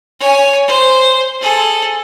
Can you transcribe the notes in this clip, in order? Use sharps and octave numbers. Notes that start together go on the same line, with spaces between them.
C#5 G#5
C5
G#4 A4